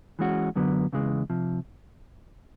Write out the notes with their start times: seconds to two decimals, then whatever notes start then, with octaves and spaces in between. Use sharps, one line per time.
0.19 E3 G#3 C#4 F#4
0.56 F#2 D3 F#3 B3
0.93 E2 C#3 E3 G#3
1.30 C3 F3